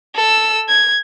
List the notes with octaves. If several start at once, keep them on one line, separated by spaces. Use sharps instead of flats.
A4 E6
G#6